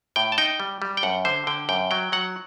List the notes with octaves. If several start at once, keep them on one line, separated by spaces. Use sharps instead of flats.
A2 G5
A5
D#4 G5
G3
G3
G5
F#2 F#5
D3 C5
D3 G5
F#2 G5
F#3 G5
F#3 F#5